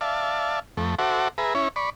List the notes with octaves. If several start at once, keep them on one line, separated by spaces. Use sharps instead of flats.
D5 E5 F5 A5
F2 A3
F#4 A4 C5 E5 F#5 D6
G#4 B4 E5 A#5
C#4 E4 C#5
D5 B5 C#6